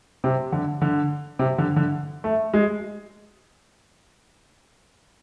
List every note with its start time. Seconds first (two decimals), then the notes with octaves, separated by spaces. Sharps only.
0.24 C3
0.52 D3
0.81 D3
1.39 C3
1.58 D3
1.76 D3
2.24 A3
2.54 G#3